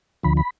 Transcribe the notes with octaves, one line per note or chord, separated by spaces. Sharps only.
D2 D3 F3 B5
B5